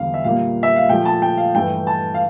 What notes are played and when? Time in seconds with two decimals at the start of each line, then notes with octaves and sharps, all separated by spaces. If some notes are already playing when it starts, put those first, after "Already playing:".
Already playing: E2 D3 G3 F5
0.14 E5
0.24 A#2 G3 A#3 F5
0.63 E5
0.76 F5
0.89 A#2 F3 A3 G5
1.05 A5
1.22 G5
1.37 F5
1.54 G2 E3 A3 G5
1.87 A5
2.14 F5